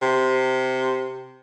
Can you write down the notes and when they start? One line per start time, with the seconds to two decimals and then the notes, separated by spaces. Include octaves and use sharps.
0.02 C3